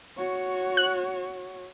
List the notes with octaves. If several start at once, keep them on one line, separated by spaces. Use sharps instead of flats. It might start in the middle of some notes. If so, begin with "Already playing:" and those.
F#4 C#5
F#6